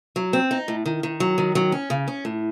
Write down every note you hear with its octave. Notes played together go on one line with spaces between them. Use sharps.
F#3
C4
D#4
A2
D#3
D#3
F#3
D#3
F#3
C#4
C#3
C#4
A2